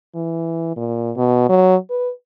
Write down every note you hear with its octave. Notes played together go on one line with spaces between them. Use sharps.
E3
A#2
B2
F#3
B4